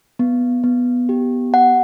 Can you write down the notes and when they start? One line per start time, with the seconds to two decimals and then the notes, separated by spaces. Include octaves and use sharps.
0.19 B3
0.64 B3
1.09 G4
1.54 F#5